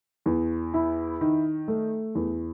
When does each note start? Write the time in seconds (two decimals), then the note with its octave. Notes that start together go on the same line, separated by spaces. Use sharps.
0.26 E2
0.74 E4
1.21 D#3
1.68 A3
2.15 E2